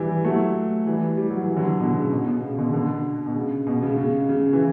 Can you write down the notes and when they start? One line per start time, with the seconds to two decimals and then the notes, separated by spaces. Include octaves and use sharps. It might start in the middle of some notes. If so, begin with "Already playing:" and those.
Already playing: E3 G3
0.24 F#3 A3
0.87 E3 G3
1.17 G3
1.30 F#3
1.44 E3
1.56 D3 F#3
1.80 B2 D3
1.96 C#3
2.12 B2
2.26 B2
2.42 C#3
2.58 B2 D3
2.73 B2 D3
3.26 B2
3.35 C#3
3.67 B2
3.83 C#3
3.98 C#3
4.29 C#3
4.53 E3